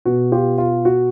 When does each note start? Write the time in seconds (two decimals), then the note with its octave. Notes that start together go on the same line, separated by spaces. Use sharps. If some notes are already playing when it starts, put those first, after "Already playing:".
0.05 B2 F#4
0.32 F4 G4
0.58 F4
0.85 F#4